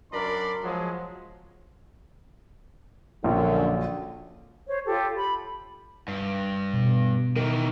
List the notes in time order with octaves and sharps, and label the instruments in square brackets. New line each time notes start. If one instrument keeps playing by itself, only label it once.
[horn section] F#2 D4 A#4 D5 B5 C6
F3 F#3 G#3
[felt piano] A#1 [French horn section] F#2 D3
[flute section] C5 C#5
F4 G4 A4
B5
[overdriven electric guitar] G2
[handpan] B2
[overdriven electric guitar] D#3 E3 [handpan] A#4